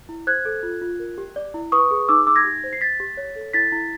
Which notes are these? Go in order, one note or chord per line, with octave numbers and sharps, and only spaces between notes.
E4
C5 F#6 G#6
A4
F4
F4
A#4
G4
D5
E4
B4 C#6 D#6
G#4
D#4 D6 E6
D#4 D6 E6
G#6 A#6
G4
C5
C7
C5 A6 B6
G4
C#5
A4
E4 A6 B6
E4